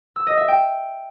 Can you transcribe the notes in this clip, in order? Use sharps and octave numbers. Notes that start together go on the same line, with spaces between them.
E6
D#5
E5
G5